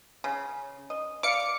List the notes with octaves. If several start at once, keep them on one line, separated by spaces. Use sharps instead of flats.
C#3
D#5
D5 F5 D6 C#7